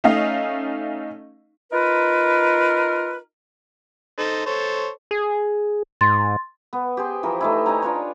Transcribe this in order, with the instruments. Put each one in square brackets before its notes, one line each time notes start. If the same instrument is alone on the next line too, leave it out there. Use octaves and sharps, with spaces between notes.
[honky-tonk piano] A3 C#4 D#4 D#5 F5
[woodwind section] D#4 F4 A#4 B4
[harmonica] D#4 A4 C5
A4 C5 C#5
[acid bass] G#4
[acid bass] G#2 [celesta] C6 A6
[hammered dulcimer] B3
G4 G#4 C5
E3 F3 A#4
A3 D#4 E4
D#4 C#5 G#5 A#5
D4 F4 B4 C#5